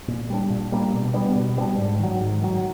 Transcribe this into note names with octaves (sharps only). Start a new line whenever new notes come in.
A#2
G3 A#3 D4
A#2
G3 A#3 D4
B2
G3 B3 D4
B2
G3 B3 D4
G#2
D#3 F#3
G#2
D#3 F#3